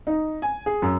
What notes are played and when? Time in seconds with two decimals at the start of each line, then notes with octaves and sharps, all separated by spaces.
0.07 D#4
0.42 G#5
0.66 G#4
0.82 F#2